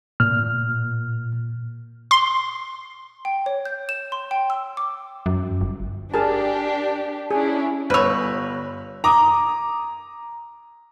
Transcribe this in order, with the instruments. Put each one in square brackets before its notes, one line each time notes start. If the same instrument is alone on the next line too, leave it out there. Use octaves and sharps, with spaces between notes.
[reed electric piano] A#2 F6
[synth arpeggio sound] C6
[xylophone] G5
C#5
G6
E7
C6
G5
E6
D6
[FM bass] F#2
G1
[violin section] D4 G4 [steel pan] G#4 A#4 A5
[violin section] C#4 D4 E4 [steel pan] G#4
[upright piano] G1 F7 [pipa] G3 C#5 [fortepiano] B4 E6
[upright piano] A#5 D6 D#6